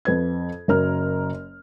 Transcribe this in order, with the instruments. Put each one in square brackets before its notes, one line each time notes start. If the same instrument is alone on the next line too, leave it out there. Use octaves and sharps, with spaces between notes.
[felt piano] F2 B4 G#6
F#1 F#2 A#4 A#5 F6